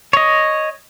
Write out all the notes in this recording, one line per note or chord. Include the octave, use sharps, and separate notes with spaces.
C#5 D#5